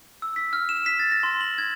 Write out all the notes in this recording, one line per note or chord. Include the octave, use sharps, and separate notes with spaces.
E6
B6
F6
E7
B6
A6
A#6
C6
F#7
G#6